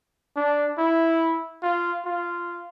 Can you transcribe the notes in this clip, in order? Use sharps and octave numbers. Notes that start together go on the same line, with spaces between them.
D4
E4
F4
F4